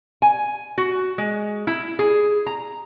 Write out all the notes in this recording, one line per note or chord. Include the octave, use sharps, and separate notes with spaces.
G#5
F#4
G#3
E4
G#4
A#5